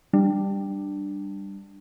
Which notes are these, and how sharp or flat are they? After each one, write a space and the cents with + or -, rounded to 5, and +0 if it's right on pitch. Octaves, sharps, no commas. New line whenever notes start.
G3 +5 D4 +10